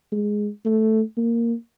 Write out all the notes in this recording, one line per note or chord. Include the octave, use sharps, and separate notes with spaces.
G#3
A3
A#3